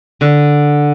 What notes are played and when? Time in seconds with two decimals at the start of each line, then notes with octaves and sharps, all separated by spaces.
0.21 D3